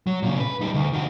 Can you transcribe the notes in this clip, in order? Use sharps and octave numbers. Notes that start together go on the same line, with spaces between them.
F#3
A#2 C#3
B4
G3 D#4
D2
D#3 F#4